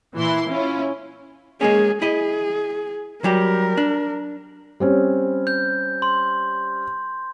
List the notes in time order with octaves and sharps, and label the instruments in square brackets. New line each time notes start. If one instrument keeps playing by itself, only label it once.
[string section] A#2 E3 E4 C6
C#4 E4 F4
[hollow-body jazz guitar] G#3 A#3 C#4 [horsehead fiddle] G#4
[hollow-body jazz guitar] E4 D#5 [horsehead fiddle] G#4
[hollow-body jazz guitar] F#3 G3 G4 [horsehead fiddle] A#4
[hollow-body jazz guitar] D4
[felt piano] G3 C4 C#4
[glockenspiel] G6
C6